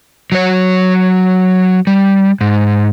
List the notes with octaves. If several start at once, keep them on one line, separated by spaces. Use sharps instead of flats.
F#3 C#5
G3
G#2